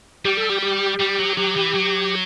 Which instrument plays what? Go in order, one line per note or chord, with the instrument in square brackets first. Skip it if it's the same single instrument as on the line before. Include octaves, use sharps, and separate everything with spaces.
[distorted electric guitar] G3 [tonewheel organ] G4
[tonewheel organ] A4
G4
G4
[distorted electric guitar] G3
F#3
[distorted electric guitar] F#3 [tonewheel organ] G4
[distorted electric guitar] E3
F#3